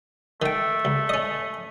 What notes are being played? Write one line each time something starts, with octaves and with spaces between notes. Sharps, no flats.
D#3 A3 G5
C#2
C#4 D#5